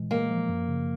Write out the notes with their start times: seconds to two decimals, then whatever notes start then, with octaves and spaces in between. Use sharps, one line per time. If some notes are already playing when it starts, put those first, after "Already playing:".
Already playing: A#2 E3 G#3
0.11 G#3 A#3
0.30 F3
0.49 F#2
0.68 C#3